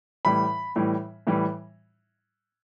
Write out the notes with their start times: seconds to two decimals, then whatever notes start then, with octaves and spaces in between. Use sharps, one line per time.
0.25 A2 E3 G3 B5
0.76 A2 E3 G3
1.27 A2 E3 G3